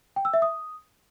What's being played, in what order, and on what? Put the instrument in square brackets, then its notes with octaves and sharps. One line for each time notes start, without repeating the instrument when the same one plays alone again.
[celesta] G5
E6
E5
D#6